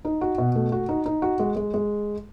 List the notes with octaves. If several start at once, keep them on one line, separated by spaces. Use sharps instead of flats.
D#4
F#4
B2
A3
F#4
D#4
D#4
F#4
G#3
G#3
G#3